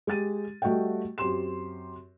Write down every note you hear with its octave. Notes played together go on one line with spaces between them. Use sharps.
G#3 G4 A6 D#7
G3 A3 F#4 D#5 F#5 G5
F#2 C4 G4 C6 E7